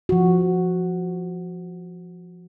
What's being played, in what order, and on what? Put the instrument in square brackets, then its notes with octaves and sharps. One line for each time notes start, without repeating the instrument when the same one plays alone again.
[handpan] F3 F#4